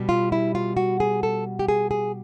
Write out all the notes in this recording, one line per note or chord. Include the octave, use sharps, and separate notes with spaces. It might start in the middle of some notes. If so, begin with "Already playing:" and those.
Already playing: B2 G3
F4
E4
F4
F#4
G#4
A4
G4
G#4
G#4